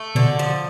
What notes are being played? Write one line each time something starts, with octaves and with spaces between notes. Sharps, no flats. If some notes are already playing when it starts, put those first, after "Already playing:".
Already playing: A3
B2 D3
F3